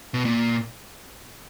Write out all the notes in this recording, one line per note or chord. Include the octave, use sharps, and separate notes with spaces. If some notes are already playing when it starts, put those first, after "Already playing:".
B2
A#2